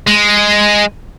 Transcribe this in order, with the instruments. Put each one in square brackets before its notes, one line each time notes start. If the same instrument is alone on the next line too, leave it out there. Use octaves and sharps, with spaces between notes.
[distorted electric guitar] G#3